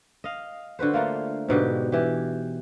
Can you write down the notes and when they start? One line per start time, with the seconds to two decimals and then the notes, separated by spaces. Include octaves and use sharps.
0.24 D#5 F5
0.79 D3 F#4 B4 C5
0.94 A3 A#3 F4
1.49 G#2 B2 D3 G4
1.92 E3 G4